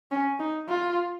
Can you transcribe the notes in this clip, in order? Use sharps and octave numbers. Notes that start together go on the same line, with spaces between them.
C#4
D#4
F4